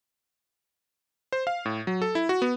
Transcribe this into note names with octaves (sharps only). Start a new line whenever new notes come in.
C5
F5
A2
F#3
A4
E4
F#4
B3